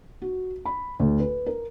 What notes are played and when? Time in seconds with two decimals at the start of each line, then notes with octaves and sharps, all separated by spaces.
0.22 F#4
0.65 B5
0.99 D2
1.20 B4
1.46 A#4